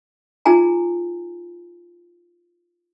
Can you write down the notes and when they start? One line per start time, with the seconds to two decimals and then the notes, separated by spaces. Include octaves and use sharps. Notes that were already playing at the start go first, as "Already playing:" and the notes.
0.45 D#4 F4 G#4 G#5 A#5